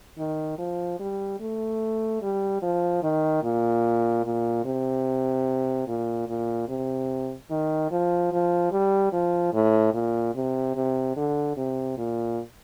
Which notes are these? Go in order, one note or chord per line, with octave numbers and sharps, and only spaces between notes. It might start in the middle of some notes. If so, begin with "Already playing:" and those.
D#3
F3
G3
A3
G3
F3
D#3
A#2
A#2
C3
A#2
A#2
C3
D#3
F3
F3
G3
F3
A2
A#2
C3
C3
D3
C3
A#2